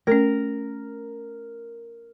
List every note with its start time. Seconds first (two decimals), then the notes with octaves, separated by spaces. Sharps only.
0.07 A3 C#4 A#4